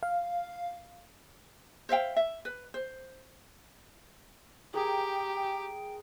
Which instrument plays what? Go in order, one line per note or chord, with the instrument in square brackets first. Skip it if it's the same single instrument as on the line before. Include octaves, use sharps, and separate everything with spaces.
[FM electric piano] F5
[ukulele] C5 E5 F5 G5
E5
B4
C5
[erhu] G4 [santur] G#4 A#4 [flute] G5